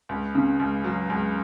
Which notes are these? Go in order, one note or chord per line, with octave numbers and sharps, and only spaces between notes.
C#2
C#3
C#2
F#3
C#2